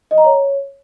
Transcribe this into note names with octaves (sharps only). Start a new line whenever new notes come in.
D#5
A#5
C#5